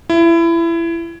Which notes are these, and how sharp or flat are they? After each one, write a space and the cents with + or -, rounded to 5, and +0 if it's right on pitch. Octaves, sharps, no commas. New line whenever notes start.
E4 +25